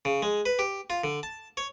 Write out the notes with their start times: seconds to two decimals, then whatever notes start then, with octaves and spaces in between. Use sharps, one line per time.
0.05 C#3
0.22 G#3
0.46 B4
0.59 G4
0.90 F4
1.04 D3
1.23 A5
1.57 C#5